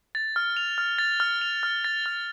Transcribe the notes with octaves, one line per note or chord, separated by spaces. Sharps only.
A6
F6
F7
F6
A6
F6
F7
F6
A6
F6